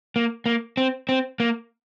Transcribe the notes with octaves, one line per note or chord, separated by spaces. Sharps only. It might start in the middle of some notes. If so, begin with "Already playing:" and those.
A#3
A#3
C4
C4
A#3